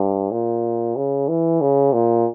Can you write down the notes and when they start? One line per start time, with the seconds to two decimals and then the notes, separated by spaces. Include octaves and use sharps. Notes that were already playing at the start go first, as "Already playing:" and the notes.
Already playing: G2
0.31 A#2
0.96 C#3
1.28 E3
1.61 C#3
1.93 A#2